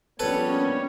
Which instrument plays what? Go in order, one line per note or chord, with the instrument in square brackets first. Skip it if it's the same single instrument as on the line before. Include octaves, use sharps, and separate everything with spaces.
[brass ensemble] A#1 F3 B3 [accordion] G3 C#5 [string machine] C#4 [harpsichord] A4 B4